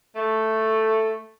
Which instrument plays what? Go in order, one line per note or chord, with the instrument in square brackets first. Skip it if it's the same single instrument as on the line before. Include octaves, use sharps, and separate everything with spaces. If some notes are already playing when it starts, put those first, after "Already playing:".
[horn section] A3